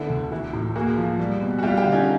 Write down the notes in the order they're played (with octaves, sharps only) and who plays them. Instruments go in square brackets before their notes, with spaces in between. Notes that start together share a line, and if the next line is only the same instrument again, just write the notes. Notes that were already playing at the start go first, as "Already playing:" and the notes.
Already playing: [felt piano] D3 [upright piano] A3 B3 D4 E4
[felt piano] D2
[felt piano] E3 [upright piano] E4 F#4
[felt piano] A2
[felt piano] A#3 [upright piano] F#4 G#4
[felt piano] F3
G3
B2
[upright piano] F#4
[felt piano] G3 [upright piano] F4 G4
[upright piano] F4 G4
[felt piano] D3
[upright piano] C#4 D#4